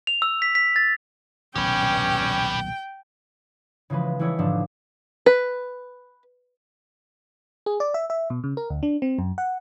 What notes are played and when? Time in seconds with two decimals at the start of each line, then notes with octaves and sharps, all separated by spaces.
0.07 F7
0.22 E6
0.42 B6
0.55 B6
0.76 A6
1.56 D#1 B1 C3 C#4 G4 B4 G5
3.90 C#3 E3 F3 G#3 B4
4.19 E3 G3 A3 E4 C#5 D#5
4.39 G#2 B2 D3 F3 D4
5.26 B4
7.66 G#4
7.80 D5
7.94 E5
8.10 E5
8.30 B2
8.44 C#3
8.57 A#4
8.70 D2
8.83 D4
9.02 C4
9.19 F#2
9.38 F#5